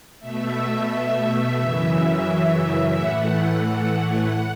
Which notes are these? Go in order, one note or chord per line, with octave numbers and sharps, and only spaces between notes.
B2 A3 E5
F#2 C#3 E3
A2 E3 A3 F#5
F#5